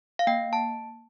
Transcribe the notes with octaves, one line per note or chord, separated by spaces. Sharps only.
F5
A#3 G5
A5